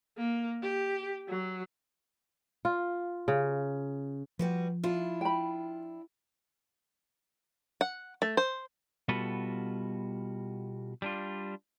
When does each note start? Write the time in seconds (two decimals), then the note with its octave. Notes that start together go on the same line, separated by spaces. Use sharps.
0.18 A#3
0.63 G4
1.29 F#3
2.65 F4
3.28 C#3
4.39 F3 G3 F#4 B4
4.83 D4 E4 F4
5.21 G5 B5
7.81 F#5
8.22 A3
8.37 C5
9.08 B2 G3 F4 F#4 A4 B4
11.02 G3 D4 F4